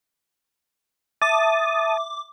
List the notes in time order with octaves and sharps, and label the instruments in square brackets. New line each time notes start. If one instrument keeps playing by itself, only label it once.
[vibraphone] E5 [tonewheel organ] A5 D#6 [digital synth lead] D6